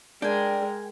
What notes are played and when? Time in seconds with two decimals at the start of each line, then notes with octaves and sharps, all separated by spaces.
0.22 G#3 D4 A#4 G5 G#5